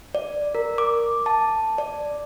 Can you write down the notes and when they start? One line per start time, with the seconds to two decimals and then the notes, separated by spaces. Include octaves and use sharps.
0.15 D5
0.55 A#4
0.78 D6
1.26 A5
1.78 D5